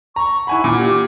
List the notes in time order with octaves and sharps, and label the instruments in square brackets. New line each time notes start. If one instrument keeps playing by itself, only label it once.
[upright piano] A#5 [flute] C#6
[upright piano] E4 G#5 B5 [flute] F#5
[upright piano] A#2 [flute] E4
[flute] G4